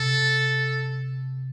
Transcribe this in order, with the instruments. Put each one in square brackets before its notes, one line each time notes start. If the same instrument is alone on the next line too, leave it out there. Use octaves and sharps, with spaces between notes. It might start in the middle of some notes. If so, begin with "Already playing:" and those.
Already playing: [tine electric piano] C3 [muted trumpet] A4